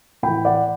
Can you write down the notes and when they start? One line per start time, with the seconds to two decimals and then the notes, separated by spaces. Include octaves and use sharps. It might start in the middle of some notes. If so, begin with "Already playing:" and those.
0.23 A2 E3 G5 B5
0.45 D5 F#5